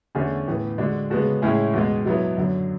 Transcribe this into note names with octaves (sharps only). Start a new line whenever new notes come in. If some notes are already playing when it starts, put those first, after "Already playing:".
E2 D3 A3 C#4 G#4
A2 E3 B3
D3 G#3 D4 F#4
C#3 G#3 B3 F#4 A4
A2 G#3 C#4 E4 G#4
E2 B2 G#3
B2 F#3 B3 E4
F#2 D3 F#3